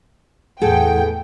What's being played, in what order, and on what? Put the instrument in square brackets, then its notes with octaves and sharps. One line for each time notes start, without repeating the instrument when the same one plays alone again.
[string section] E2 A2 G5 [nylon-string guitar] G#4 A4 [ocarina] F#5